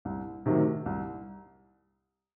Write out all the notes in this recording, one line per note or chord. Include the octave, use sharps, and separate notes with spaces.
C2
C3 D#3 F#3 A3
C2